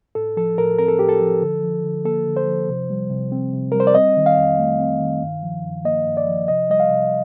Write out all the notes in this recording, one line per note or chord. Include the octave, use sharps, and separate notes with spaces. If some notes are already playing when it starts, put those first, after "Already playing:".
A2 A4
F3 A4
A2 A#4
C4 A#4
A4
A2 G4
A4
F3
D3
F3
D3
A#3 A4
D3
C5
F3
C3
G3
C3
C4
C3
G3 A#4
C5
D5
C4 D#5
D#3
F5
F2
A3
C4
D#3
G2
F3
G2
A#3 D#5
G2
D5
F3
C3 D#5
G3 D#5
F5
C3